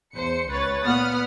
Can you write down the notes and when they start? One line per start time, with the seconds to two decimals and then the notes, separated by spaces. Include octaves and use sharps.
0.12 E2 C5 C#7
0.49 C#2 B4 C#5 A6
0.83 A#2 B3 B4 F#5 D#6 F6